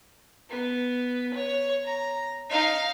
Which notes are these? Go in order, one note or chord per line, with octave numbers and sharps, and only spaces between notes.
B3
C#5
A#5
D#4 F5